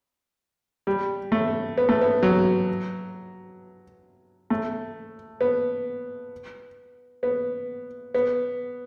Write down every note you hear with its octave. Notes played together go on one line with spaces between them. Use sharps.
G3
A3
B3
A3
B3
F#3
A3
B3
B3
B3